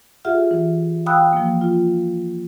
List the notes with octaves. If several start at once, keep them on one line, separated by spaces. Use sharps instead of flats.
F4 G4 G#4 E5 F#5 F6
E3
F5 G5 B5 D#6 E6 F#6
F3 A#3
F4